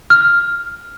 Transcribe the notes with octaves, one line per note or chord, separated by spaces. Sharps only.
F6